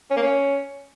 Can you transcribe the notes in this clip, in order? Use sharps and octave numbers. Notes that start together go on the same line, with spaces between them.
C#4
A#3
C#4